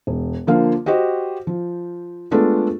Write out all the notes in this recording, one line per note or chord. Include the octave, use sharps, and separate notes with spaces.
E1
D3 F3 A#3 F5
F#4 G4 C5 D#5
F3
G#3 A3 B3 D4 F4 A4